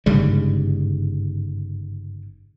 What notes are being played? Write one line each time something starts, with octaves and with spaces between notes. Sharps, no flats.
G1 G#2 C#3 G3